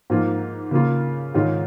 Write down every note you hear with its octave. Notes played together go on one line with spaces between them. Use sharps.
G#2 F3 A#3 F4
C#3 A#3 F4
G#2 D#3 G#3 C#4 F4